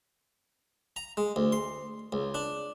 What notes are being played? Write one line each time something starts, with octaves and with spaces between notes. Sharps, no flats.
A#5
G#3
D2
C6
C#2
D4